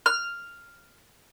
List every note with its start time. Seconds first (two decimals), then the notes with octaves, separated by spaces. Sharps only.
0.06 F6